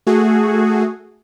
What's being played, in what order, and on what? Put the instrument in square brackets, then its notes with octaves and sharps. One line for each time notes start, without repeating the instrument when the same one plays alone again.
[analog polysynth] A3 F#4 G#4